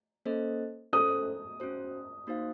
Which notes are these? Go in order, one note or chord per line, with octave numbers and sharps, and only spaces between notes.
A#3 C#4 A4 C5 D#5
C#4 A4 C5 D#6
C#4 F#4 C5
A#3 D#4 F#4 C5 F5